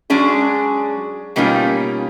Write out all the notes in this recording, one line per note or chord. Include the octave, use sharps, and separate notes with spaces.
F#3 G#3 C#4 D4 G#4
B2 G3 A#3 C#4 D#4 F4